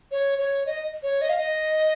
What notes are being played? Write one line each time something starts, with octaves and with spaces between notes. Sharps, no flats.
C#5
C#5
D#5
C#5
D#5
F5
D#5